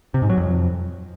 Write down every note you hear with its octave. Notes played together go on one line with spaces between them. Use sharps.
C3
G#2
F#3
F2